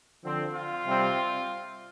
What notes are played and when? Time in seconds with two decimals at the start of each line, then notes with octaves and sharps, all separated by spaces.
0.23 D3 F3 C4
0.54 F4
0.86 C3 G3 C4